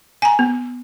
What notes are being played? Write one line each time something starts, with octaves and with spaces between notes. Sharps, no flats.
G#5 A#5
B3